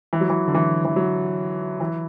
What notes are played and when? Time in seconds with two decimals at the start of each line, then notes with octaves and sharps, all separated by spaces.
0.13 E3
0.21 F#3
0.29 E3
0.48 D3
0.54 E3
0.85 E3
0.96 F#3
1.80 E3